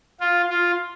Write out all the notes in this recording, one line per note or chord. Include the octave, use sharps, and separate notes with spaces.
F4
F4